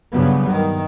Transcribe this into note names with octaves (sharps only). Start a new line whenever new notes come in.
G2 C#3 F#3 G3 B3
D#3